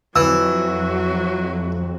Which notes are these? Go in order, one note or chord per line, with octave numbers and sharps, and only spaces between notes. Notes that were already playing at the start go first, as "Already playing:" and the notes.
F2 E3 F#3 F#4 E6